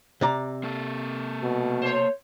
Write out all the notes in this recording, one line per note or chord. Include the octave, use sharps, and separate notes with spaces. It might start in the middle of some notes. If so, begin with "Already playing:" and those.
C3 D5 A#5
A#3 A4
B2
C5 C#5